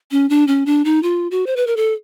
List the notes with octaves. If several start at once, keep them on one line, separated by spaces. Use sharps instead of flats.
C#4
D4
C#4
D4
D#4
F4
F#4
C5
B4
A#4
A4